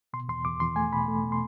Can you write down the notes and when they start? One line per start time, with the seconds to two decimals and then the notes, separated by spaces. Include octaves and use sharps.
0.13 B2 C6
0.29 E2 C6
0.45 E2 D6
0.60 E2 C6
0.76 A3 G#5
0.92 B2 B5
1.08 A3
1.23 B2
1.32 C6